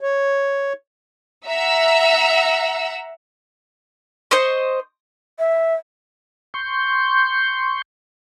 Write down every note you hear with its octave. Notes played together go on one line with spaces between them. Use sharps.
C#5
E5 F#5 A#5 E6
C5 D#5 C6 C#6
E5
C6 C#6 G6